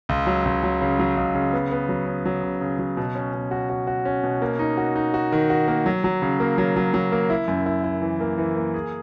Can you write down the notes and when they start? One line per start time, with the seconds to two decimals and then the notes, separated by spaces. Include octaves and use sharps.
0.09 C#2
0.27 F#3
0.45 C#2
0.63 F#3
0.82 C#3
0.99 F#3
1.17 C#2
1.35 C#3
1.53 B3
1.71 B3
1.89 F#3
2.07 C#3
2.25 F#3
2.43 C#3
2.61 C#3
2.79 F#3
2.97 B2
3.15 C#4
3.34 B2
3.51 F#4
3.69 F#4
3.87 F#4
4.05 C#4
4.24 B2
4.42 A#3
4.59 D#4
4.77 F#4
4.96 D#4
5.14 F#4
5.32 D#3
5.50 F#4
5.68 A#3
5.86 F#3
6.04 F#3
6.22 C#3
6.40 A#3
6.58 F#3
6.76 F#3
6.94 F#3
7.12 A#3
7.30 E4
7.48 F#2
7.66 E4
7.84 E4
8.02 E3
8.20 A#3
8.38 E3
8.56 A#3
8.74 G#4